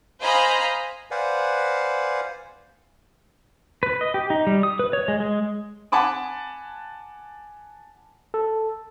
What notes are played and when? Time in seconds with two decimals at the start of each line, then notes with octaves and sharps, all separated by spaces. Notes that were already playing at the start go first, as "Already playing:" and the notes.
0.22 C5 D#5 F5 G#5 A#5 B5
1.11 B4 C5 D5 F5 F#5 G#5
3.83 B4
4.01 D#5
4.14 G4
4.30 D#4
4.47 G3
4.63 D#6
4.79 B4
4.93 C#5
5.08 G#3
5.20 G#3
5.92 F#5 G#5 A5 B5 D6
8.34 A4